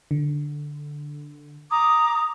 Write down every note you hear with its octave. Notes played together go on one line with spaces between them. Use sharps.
D3
A#5 D6 D#6